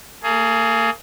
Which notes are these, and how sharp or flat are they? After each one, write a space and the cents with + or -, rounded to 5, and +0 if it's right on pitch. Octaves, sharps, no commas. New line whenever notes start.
A#3 -40 G#4 +20